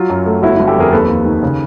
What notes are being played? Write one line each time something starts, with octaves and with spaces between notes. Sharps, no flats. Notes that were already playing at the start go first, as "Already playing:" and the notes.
Already playing: F#3 F4
F#2
A3
G1 E4 F#4
G1 E4
G4 A4
F2 G#4 A#4
D#2 A4 B4
D#2
D#3
C#3